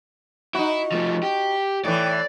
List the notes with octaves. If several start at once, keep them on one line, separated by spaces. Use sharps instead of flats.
D#4 E4 F#4
F3 A3
G4
A2 E3 D5